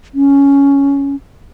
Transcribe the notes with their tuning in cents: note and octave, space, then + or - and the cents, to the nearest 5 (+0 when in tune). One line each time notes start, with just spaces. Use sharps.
C#4 +10